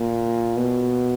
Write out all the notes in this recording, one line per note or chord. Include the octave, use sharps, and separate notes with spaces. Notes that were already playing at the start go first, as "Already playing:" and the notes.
Already playing: A#2
B2